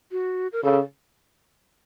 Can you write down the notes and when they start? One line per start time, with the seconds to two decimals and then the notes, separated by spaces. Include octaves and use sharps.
0.12 F#4
0.53 A#4
0.63 C#3 A4